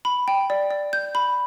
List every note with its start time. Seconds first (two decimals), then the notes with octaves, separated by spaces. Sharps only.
0.05 B5
0.28 G5
0.50 D5
0.71 D5
0.93 G6
1.15 B5